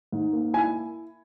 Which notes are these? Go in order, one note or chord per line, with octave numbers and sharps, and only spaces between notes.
G#2
A#3
E4 G#5